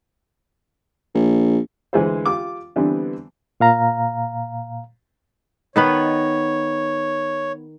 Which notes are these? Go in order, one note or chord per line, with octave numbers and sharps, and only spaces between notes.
A#1
D2 E3 G#3 C5
F4 G4 D6
D3 E3 G3 B3 C4 D4
A#2 F5 A#5
D#3 B3 B4 C#5